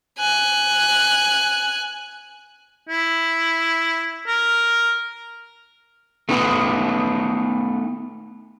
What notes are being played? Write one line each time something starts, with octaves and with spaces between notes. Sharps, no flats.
G#5 F#6
E4
A#4
A3 B3 D#4 A#4 B4